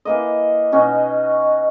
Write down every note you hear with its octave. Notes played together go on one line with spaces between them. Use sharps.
E3 A#3 D#5
B2 C#4 D#4 F#4